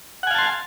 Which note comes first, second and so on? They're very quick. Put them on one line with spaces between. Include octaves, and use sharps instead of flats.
F#5 G#5 F5 A5 C6